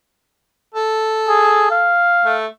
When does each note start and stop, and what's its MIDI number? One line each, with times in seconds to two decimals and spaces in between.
0.74 1.93 69
1.29 1.68 68
1.71 2.38 77
2.25 2.46 57